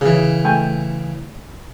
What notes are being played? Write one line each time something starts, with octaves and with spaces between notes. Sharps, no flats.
C#3 E3 G#4
A3 G5 G#5